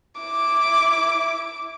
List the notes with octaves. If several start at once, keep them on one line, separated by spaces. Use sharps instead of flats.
E4 D6